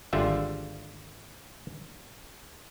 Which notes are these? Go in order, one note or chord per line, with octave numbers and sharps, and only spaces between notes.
G#1 D3 G3 F4 E5